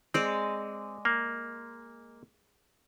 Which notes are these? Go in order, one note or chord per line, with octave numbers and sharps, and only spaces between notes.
G#3 C4 D5
A#3